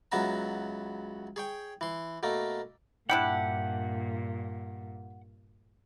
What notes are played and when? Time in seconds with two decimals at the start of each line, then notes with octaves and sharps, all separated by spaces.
0.12 C#2 F#3 B3 E5 A#5
1.36 G#4 C#5 G5
1.81 E3 C6
2.23 B2 A3 A#3
3.10 G2 A#2 D4 E4 G4 F#5